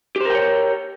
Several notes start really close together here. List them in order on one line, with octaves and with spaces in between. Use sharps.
G4 C5 A#4 G5 C#5